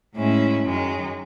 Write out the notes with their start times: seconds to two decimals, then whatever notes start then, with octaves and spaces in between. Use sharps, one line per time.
0.14 A2 G#3 C#4 E4
0.64 F#2 D#3 G#3